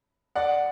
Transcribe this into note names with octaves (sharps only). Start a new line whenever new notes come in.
D5 F#5